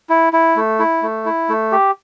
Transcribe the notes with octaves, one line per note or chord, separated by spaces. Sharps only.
E4
E4
A3
E4
A3
E4
A3
G4